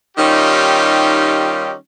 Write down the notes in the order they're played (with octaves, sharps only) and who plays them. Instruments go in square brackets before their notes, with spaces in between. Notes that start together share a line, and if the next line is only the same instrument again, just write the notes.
[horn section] D#3 G3 C#4 D#4 F4 G4